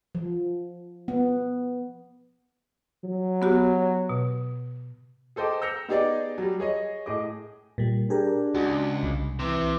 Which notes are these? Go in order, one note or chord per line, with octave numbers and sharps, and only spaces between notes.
F3
B3
F#3
B3 F#4 G4
B2
G#4 A4 C5 D#5 G5 D6
E6 G6 A#6 C#7 F7
B3 D#4 G4 G#4 D5 D#5
F#3 G3
G#4 C#5 D#5
A2 G#4 D#5 D6
A#2 G3
D4 G4 G#4 A#4
C#2 F#4
C2
C3 E3